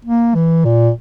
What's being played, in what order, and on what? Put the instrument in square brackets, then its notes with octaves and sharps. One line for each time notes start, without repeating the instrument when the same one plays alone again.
[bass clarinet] A#3
E3
A#2